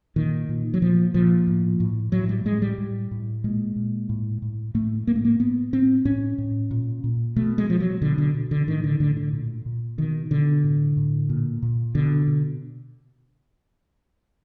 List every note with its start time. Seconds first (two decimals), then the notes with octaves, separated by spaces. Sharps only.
0.16 A#2 D#3
0.49 A#2
0.74 F#3
0.82 A#2 F3
1.14 A#2 F3
1.47 A2
1.80 A2
2.12 A2 F#3
2.29 G3
2.45 A2 G#3
2.62 G3
2.78 A2
3.11 A2
3.44 A#2 G#3
3.76 A#2
4.09 A2
4.42 A2
4.74 A2 A3
5.07 A2 A#3
5.15 A3
5.25 A#3
5.40 A2 B3
5.73 A2 C4
6.05 A2 C#4
6.38 A2
6.71 A#2
7.04 A#2
7.36 B2 A3
7.58 G#3
7.69 B2 F3
7.80 F#3
8.01 B2 D3
8.18 D3
8.35 B2
8.51 D3
8.67 A2 D#3
8.84 D3
9.00 A2 D3
9.17 D3
9.33 A#2
9.66 A#2
9.98 B2 D#3
10.31 B2 D3
10.64 A2
10.97 A2
11.29 A#2
11.62 A#2
11.95 B2 D3
12.27 B2